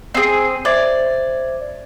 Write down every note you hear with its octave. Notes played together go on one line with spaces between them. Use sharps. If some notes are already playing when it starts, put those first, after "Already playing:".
C4 G#4
C5 D5 E5 G#6